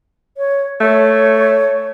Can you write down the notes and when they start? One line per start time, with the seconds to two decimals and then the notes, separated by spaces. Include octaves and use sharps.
0.37 C#5
0.80 A3 C#5